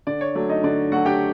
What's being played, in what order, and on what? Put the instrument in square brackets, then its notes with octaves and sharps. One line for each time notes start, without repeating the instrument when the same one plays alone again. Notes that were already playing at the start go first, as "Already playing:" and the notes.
[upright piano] D3 D5
C#5
F#3 A3 D5
D#4 D#5
D3 D5
F#3 A3 F#4 F#5
G4 G5